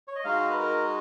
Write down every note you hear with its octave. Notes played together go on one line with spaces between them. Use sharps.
C#5
D#5
G#3 D#4 F#4 F5
B4
A#4